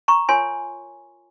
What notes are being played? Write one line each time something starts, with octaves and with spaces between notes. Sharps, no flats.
A#5 C#6
F4 A#4 C#5 G#5 C6